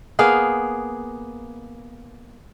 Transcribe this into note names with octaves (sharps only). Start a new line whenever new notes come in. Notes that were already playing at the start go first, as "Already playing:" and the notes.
A#3 B3 G#4 F5